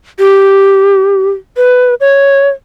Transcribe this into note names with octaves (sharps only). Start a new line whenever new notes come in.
G4
B4
C#5